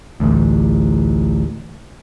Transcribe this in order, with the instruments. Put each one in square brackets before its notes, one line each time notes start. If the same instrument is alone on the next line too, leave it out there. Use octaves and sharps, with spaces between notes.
[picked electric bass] A1 D2